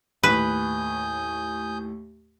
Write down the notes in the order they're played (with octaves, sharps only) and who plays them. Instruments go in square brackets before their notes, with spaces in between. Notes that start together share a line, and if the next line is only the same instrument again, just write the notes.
[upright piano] D#2 A2 [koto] B4 [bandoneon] G#5 D#6 G6